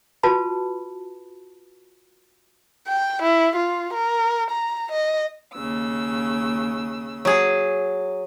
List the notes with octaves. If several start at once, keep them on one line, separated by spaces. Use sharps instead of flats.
F4 F#4 B4 A5 B5
G5
E4
F4
A#4
A#5
D#5
D#2 C#3 E6
F#3 G#4